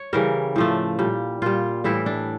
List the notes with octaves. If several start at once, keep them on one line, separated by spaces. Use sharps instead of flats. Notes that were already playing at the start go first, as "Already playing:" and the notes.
Already playing: C#5
C#3 E3 G3 A#4
A2 F3 A3
A#2 G3
A#2 G3 F4
A2 E3 G3 E4
D4